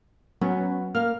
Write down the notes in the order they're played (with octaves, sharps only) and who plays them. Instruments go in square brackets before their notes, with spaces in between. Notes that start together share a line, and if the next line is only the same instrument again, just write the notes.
[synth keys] F#3 C#4 [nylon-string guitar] B3
[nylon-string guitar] A#3 [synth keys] F6